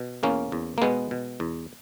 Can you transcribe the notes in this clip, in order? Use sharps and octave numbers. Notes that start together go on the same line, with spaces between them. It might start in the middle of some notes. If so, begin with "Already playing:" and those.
Already playing: B2
E2 A#3 C#4
E2
A#3
B2 G#3 B3
B2
E2